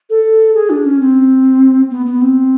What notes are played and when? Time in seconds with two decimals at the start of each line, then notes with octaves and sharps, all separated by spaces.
0.10 A4
0.55 G#4
0.70 D4
0.85 C#4
1.00 C4
1.91 B3
2.06 B3
2.21 C4